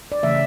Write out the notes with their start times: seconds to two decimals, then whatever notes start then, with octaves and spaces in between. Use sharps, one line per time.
0.12 D5
0.23 C#3 E3 A3 C#4 E5